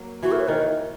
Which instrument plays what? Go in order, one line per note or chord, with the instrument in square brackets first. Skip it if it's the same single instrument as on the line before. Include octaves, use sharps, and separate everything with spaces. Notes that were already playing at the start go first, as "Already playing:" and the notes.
Already playing: [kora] F#3 A#3
[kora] E3 [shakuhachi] F#4
[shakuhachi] A#4
C#5
[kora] D#3 [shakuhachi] A#4